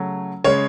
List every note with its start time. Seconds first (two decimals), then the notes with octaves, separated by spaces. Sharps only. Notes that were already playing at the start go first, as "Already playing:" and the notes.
Already playing: C#3 F#3 A3
0.44 C#3 G#3 C#5